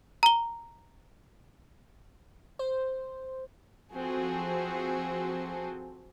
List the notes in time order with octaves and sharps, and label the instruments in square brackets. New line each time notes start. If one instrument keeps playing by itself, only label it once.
[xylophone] A#5 G7
[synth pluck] C5
[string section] F3 C4 F#4 G#4 A4